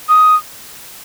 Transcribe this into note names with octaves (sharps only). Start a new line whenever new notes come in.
D#6